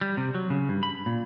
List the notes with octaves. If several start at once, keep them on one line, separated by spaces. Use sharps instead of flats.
G3
C3
F#3
C#3
G2
B5
A#2